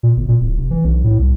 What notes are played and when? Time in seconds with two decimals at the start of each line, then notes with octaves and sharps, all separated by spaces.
0.03 A#2
0.17 G1
0.28 A#2
0.41 D1
0.57 F1
0.71 E3
0.85 B1
1.04 A2
1.19 C2